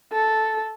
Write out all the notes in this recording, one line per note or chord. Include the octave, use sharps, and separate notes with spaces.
A4